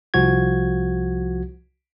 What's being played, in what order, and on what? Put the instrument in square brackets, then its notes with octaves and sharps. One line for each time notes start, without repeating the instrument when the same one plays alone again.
[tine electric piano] C2 F3 F#4 G#6